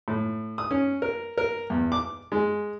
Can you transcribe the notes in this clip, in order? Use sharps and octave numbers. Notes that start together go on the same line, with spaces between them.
A2
D#6
C#4
A#4
A#4
E2
D6
G#3